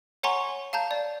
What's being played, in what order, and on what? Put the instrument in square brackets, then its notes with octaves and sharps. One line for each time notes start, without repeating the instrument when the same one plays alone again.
[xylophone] C#5 F#5 G#5 A#5 C6 C#6
F5 A5 A#5 G6
D5